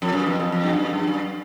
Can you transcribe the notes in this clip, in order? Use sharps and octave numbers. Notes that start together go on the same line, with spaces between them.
F2
F#2
F2
F2
F2
G2
F#2
G2
F#2